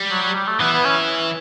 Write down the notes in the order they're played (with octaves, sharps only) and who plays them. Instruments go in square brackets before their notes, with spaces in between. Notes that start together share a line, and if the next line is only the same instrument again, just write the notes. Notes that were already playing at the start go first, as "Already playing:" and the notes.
Already playing: [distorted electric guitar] G3
[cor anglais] F#3
F#3
G3
A3
[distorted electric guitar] E3 [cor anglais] B3
[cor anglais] B3
C#4